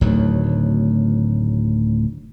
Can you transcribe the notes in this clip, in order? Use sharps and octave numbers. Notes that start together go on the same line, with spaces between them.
D1 D2 D#3 F#3